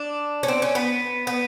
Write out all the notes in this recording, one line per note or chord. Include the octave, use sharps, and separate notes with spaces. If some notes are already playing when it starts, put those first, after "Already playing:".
Already playing: D4
C#4
C4
C#4
B3
B3